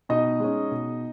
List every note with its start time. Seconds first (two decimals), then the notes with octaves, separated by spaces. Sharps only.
0.09 B2 D#4 D#5
0.40 G#3 C#4
0.71 B2